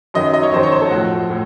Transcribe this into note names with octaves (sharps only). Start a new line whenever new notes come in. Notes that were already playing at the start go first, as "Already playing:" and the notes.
F#2 D#3 F#3 D#5
D#5
C#5
F#2 D#3 F#3 C5
C#5
C5
A4
A2 F3 F#4
A2